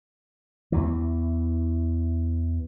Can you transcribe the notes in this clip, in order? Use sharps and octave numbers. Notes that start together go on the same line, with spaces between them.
E2 E3